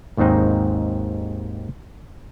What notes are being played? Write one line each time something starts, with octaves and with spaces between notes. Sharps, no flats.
G#1 D#2 G#2 C4 D#4